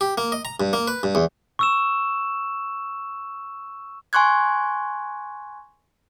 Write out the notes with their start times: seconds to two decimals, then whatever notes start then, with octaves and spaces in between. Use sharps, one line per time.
0.01 G4
0.18 A#3
0.32 D#5
0.45 A#5
0.60 G2
0.73 A#3
0.88 B4
1.03 G2
1.15 E2
1.59 C#6 E6 E7
4.13 G#5 C6 C#6 F#6 G#6